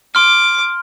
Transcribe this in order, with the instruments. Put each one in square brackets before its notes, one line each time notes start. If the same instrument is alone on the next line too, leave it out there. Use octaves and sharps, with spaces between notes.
[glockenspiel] C6 F6 [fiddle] D6